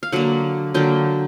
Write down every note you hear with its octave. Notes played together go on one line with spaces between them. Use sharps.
F5
D3 F#3 A#3 F#5
D3 F#3 A#3 G5